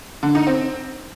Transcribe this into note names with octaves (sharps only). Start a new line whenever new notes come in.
D3
D#4
C4